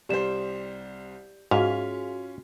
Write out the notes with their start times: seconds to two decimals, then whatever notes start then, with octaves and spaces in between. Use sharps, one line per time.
0.09 C2 G3 G4 C5 D5 E7
1.51 G#2 C#4 F4 F#4 G#4 F5 F7